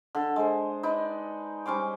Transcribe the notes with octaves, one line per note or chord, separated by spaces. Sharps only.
D3 A4
G#3 C5
D#4 B4 D5
G3 C#4 C5 D6